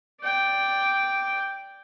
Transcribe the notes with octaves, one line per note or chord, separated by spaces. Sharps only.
D5 G5